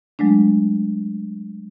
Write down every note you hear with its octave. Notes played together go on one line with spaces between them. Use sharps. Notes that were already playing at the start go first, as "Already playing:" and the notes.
F#3 G#3 A3 D4